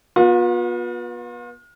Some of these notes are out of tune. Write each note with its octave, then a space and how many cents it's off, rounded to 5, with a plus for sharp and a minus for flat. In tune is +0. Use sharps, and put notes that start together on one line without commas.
B3 -30 F4 +40